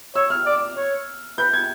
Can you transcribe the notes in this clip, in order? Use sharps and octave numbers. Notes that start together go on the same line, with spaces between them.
C#5 E6
F6
D5
C#5
B4 G6
G#6